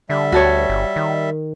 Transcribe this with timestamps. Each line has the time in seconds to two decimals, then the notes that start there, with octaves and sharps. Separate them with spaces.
0.10 D3 G3 E5
0.32 D2 F#4 A4 C#5
0.69 G1
0.96 D#3